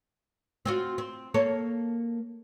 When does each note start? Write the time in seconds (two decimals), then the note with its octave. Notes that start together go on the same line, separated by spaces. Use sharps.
0.66 C4 F4 F#4
0.98 C4
1.34 A#3 A4 C#5